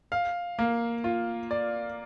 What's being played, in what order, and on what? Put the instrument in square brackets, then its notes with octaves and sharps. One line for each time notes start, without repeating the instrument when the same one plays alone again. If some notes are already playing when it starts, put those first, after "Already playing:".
[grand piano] F5
A#3
F4
D5